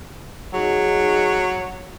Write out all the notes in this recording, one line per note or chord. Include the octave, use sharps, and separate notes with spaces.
F#3 D#4 G#4